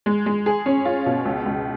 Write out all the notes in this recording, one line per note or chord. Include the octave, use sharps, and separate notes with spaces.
G#3
G#3
G#4
C#4
F4
B2
C#2
C#2